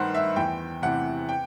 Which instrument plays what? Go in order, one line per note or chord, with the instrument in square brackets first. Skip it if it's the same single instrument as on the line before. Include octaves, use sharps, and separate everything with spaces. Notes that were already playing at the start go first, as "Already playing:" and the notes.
Already playing: [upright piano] G2 D#3 B4 C5 F#5
E5
E2 G5
C3 E3 F#5
G5